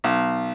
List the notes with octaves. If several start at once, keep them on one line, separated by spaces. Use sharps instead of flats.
B1